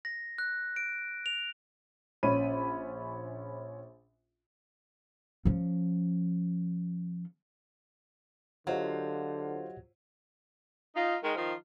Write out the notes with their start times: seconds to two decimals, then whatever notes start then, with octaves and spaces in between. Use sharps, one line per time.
0.05 A#6
0.38 F#6
0.76 D7
1.26 F7
2.23 A#1 C#4 B5 D#7
5.45 F3 C#4
8.67 D3 F#3 F4 G4 C5 C#5 D#5 F#5
10.95 D#4 F4
11.23 D#3 G#3
11.35 D#3 F3 D#4 F4